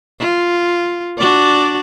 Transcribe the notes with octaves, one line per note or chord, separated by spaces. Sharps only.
F4
D4 F#4 D5